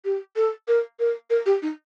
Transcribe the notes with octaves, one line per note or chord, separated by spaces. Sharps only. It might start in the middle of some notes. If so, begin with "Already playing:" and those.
G4
A4
A#4
A#4
A#4
G4
D#4